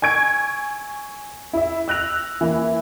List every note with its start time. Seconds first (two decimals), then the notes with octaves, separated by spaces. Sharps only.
0.02 G#5 C#6 G#6 D7
1.53 E4 E5
1.88 E6 F#6 A#6 F7
2.41 E3 A#3 E4